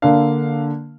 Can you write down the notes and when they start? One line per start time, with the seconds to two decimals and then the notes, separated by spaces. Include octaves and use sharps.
0.02 D3 A#3 D4 F5